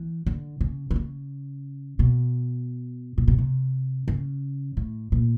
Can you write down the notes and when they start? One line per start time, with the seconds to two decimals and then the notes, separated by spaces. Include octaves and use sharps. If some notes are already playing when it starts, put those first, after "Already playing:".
Already playing: E3
0.26 D3
0.61 C#3
0.91 D3
0.96 C#3
1.99 B2
3.18 A#2
3.28 B2
3.38 C3
4.08 C#3
4.77 A2
5.12 A#2